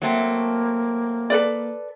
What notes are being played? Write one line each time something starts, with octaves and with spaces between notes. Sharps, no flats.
F#3 A3 A#3 C4
A4 B4 D5